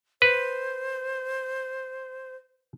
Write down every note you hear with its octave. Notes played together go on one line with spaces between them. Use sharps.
B4 C5